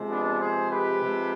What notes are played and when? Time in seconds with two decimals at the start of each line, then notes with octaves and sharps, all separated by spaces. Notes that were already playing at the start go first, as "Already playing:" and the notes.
Already playing: C3 F3 G#3
0.09 B3 D4
0.40 G#4 C5
0.71 G4 B4
1.02 C3 F3 G#3